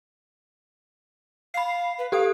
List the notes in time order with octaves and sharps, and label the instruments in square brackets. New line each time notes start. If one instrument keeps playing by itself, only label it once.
[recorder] F5 [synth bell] B5 C7
[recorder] B4
[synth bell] G4 A4 D#6 [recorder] F5